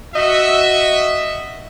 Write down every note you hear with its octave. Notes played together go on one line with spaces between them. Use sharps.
F#4 D#5 E5